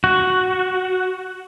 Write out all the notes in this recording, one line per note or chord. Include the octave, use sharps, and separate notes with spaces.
F#4